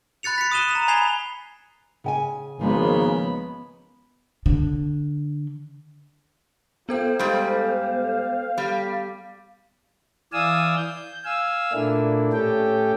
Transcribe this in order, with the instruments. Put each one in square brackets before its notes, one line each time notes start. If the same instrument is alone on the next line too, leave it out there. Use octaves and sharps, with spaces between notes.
[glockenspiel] B5 F#6 A6 C#7 F7
B6 C#7
D#6 F#6 D#7 E7 G7
A#5 F7
G#5 B5 G#6 C7 F7 G7
[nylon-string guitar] C#3 G5 G#5
[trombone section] G#1 C#3 A#3 [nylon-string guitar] F3 G#3 [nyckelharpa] B3 B5
[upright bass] D3
[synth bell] B3 A4 G5 [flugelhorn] F4 [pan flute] C5
[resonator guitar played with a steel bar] G#2 G3 [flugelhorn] F5
[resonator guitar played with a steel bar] G3
[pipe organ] E3 D5 F5 G#5 D#6 E6
G6
F5 G#5 E6
A#2 A3 A#3 D4 E4
A2 A3 C#4 G4 A4 G5